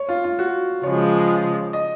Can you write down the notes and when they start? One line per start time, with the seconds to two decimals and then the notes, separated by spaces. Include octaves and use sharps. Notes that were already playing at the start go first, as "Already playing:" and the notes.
Already playing: C#5
0.09 F4
0.24 F4
0.39 F#4
0.83 C#3 F3 G#3 C#5
1.73 D#5